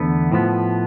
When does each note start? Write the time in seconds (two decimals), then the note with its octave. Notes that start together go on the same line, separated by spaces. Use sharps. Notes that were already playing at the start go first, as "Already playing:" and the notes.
Already playing: E2 D3 A3 B3
0.32 A2 F3 B3